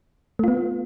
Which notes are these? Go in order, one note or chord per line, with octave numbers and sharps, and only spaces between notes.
A3 B3 F4